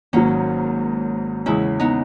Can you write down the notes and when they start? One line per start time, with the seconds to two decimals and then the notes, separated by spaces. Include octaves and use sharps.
0.13 G#1 G#2 F#3 A#3 C#4
1.46 E2 C#3 G#3 C#4 E4
1.80 B3 D#4